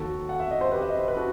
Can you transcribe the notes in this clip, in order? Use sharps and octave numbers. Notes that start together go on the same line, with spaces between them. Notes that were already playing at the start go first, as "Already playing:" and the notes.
Already playing: D#2 D#3 F#4 A4
F#5
E5
D#5
C5
G4 B4
E5
D#5
C5
B4
F#4 A4